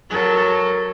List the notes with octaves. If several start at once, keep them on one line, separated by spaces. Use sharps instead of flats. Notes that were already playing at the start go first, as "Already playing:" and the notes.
F#3 A4 A#4